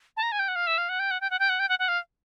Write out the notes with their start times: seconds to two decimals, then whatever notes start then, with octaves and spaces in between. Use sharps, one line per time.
0.17 A5
0.23 A#5
0.32 G#5
0.39 G5
0.48 F#5
0.56 F5
0.67 E5
0.78 F5
0.89 F#5
0.99 G5
1.11 F#5
1.21 G5
1.30 F#5
1.39 G5
1.49 F#5
1.59 G5
1.69 F#5
1.79 F#5
1.88 F5